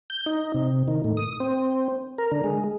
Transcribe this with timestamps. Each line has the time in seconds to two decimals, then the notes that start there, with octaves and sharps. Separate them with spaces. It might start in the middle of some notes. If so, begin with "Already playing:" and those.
0.10 G6
0.26 D#4
0.54 C3
0.88 D#3
1.04 A2
1.17 D#6
1.40 C4
2.18 A#4
2.32 D3
2.44 G#3